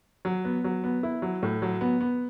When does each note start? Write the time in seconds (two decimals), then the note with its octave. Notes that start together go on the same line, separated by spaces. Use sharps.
0.25 F#3
0.45 B3
0.64 F#3
0.84 B3
1.03 E4
1.22 F#3
1.43 A2
1.62 F#3
1.81 B3
2.01 B3